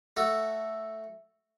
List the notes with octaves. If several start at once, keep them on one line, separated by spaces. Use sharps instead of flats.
A3 F#4 A4